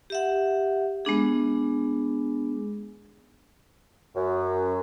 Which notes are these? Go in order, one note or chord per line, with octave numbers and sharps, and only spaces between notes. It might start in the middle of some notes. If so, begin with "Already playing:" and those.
G4 E5 F#5
G#3 B3 D4 G#4
F#2